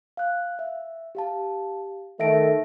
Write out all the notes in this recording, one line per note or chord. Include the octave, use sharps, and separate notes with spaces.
F5 F#6
E5
G4 F5 A5
D#3 A3 E5 A#6 D7